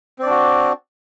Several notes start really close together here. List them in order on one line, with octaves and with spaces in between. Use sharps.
C4 D5 D4 F#4